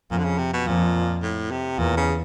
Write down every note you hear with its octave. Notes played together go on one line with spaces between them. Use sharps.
F2 A#2
D3
C#3
C3
B2
F2 A#2
A2
C3
E2 A#2
C#3